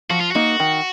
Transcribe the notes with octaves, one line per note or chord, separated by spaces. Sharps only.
F3 F#4
F4
A#3 D#4 F#4
D#3